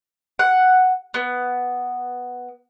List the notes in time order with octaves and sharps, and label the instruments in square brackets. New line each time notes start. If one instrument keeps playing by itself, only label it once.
[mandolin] F#5
B3